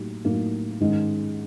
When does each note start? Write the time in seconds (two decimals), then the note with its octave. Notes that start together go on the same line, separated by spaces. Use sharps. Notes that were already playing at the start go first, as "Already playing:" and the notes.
Already playing: A2 F#3 A#3 D#4 G4
0.24 A2 F#3 A#3 D#4
0.80 G#2 D#3 G#3 C#4